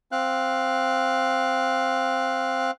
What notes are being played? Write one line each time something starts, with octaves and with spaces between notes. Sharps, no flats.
C4 F5 F#6